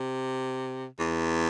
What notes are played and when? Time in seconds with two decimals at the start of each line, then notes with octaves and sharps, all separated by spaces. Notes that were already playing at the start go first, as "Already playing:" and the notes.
Already playing: C3
0.99 E2